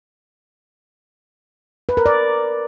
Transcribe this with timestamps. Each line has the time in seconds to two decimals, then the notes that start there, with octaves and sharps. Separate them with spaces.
1.89 B4
1.97 A#4
2.06 D5